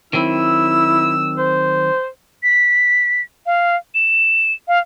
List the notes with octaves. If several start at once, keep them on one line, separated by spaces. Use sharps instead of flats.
D#3 F#3 C4 E4 E6
C5
B6
F5
E7
F5